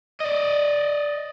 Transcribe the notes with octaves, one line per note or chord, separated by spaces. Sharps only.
D5 D#5